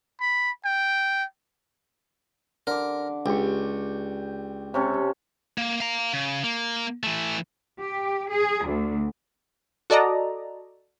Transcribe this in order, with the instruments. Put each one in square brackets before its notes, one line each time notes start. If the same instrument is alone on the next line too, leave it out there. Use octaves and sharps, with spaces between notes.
[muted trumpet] B5
G5
[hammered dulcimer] D3 D6 [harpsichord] A#4
[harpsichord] C#2 [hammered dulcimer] G4 C#6
[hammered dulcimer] C3 C#4 A4
[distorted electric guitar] A#3
F5 A#5
C#3
A#3
E3 A3
[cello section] G4
G#4
D2
[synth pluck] F#4 A4 D5 D#5 A#5